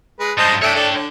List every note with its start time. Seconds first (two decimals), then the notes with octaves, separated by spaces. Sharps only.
0.20 G#3 B4
0.38 G2 G#3 C5 D#5 A5
0.62 A3 D4 C#5 E5 G5
0.75 D4 A4
0.92 D3